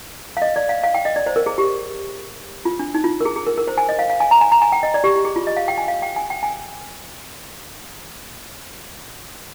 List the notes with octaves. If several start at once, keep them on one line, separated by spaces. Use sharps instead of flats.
F5
D#5
D5
F5
F5
G5
D#5
D5
C5
A#4
G#4
G4
F4
D4
D#4
F4
A#4
G#4
G#4
A#4
A#4
C5
G#5
D#5
F5
F5
G#5
A#5
G#5
A#5
G#5
G5
D#5
D5
G4
G4
G#4
F4
D#5
F5
G5
G#5
F5
G5
G#5
G5
G#5